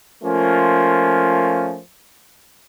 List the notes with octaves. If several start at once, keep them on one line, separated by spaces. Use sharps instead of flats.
F3 A3 A#3 C#4 F4